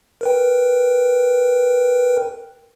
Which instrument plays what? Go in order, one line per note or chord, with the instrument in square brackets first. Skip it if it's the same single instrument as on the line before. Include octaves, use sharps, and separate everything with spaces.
[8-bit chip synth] A#4 B4 G5